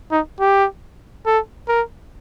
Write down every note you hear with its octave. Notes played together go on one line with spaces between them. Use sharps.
D#4
G4
A4
A#4